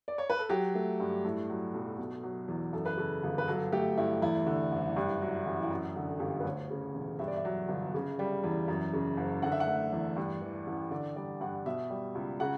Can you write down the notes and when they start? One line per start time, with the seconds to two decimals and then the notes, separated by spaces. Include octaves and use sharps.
0.08 D5
0.18 C#5
0.30 B4
0.39 A4
0.49 F#3 G4
0.75 A3
1.00 G2
1.25 A2 A4
1.50 F#3
1.74 B1
1.98 B2
2.23 F#3
2.48 E2
2.73 F#2 A4
2.85 B4
2.97 C#3 A4
3.23 G1
3.38 B4
3.48 F#3 A4
3.72 A3 G4
3.98 G2 E4
4.22 E2 E4
4.46 D3
4.72 F#1
4.96 G2
5.22 F#3
5.46 A1
5.62 E4
5.70 F#2 F#4
5.96 D3
6.09 A4
6.20 G1 G4
6.40 B4
6.44 D2 C#5
6.70 C#3
6.95 E1
7.19 G2 E5
7.28 D5
7.36 E5
7.45 F#3
7.68 G1
7.94 C#3
8.19 G3
8.44 E2
8.68 F#2
8.93 C#3
9.17 F#1
9.42 D3 F#5
9.52 E5
9.60 F#5
9.67 A3
9.93 E2
10.16 G2
10.41 E3
10.67 A1
10.91 D3 D5
11.16 G3 D5
11.41 G2 F#5
11.66 B2 E5
11.90 G3
12.15 C#2
12.40 C#3 F#5